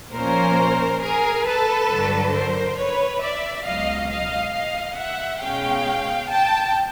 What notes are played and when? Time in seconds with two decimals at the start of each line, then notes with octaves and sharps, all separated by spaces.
0.14 A#2 F3 A#3 C#4 A#4 C5
1.02 G#4 A#4
1.46 A4 B4
1.90 G2 D3 F#3
2.34 A#4 C5
2.77 B4 C#5
3.22 D5 E5
3.65 C#2 B2 F#3 D#5 F5
4.10 D#5 F5
4.54 D#5 F5
4.98 E5 F#5
5.41 B2 G#3 C#4 F5 G5
6.29 G5 A5